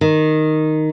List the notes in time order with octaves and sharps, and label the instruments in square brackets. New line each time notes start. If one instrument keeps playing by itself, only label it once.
[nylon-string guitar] D#3